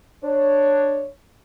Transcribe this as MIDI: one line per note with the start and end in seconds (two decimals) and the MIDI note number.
0.24 1.06 62
0.24 1.06 73